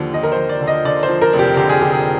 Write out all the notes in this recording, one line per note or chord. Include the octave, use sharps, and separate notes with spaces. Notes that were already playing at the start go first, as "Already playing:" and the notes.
Already playing: D#2 D3 F3
F3 D#5
A#4
C5
D#2
D5
D3
D#5
D3 D5
C5
F3
A#4
F1
G4
D3 G4
G#4
D3 G4
G#4